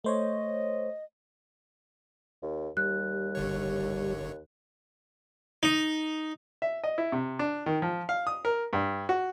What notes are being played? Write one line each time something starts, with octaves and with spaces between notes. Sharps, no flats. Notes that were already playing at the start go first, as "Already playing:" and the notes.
A3 C5 C#5 D#5
D#2
D#2 G3 F#6
G1 D3 C#5
D#4
E5
D#5
E4
C3
D4
D#3
F3
F5
D#6
A#4
G2
F#4